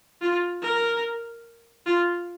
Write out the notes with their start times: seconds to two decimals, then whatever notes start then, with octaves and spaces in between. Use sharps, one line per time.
0.22 F4
0.62 A#4
1.86 F4